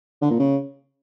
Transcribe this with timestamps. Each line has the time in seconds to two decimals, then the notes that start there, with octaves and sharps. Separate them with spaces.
0.22 D3
0.31 A#2
0.39 C#3